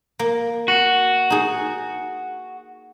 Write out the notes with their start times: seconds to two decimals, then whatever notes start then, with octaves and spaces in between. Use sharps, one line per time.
0.19 A#3
0.68 F#4
1.30 D#4 G#4